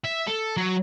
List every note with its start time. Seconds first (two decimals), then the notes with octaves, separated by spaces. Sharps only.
0.05 E5
0.27 A4
0.57 F#3